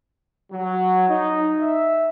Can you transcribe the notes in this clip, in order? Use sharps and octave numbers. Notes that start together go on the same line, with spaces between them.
F#3
D#4
E5